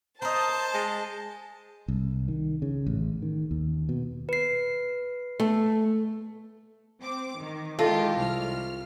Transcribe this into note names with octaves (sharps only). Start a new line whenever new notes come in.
A#4 C5 D#5 A5
G#3
C2
D#3
C#3
A1
D#3
D#2
B2
B4 C7
A3
C4 D6
D#3
D#3 G#3 E4 F4 G4 A4 D#5
C2 F6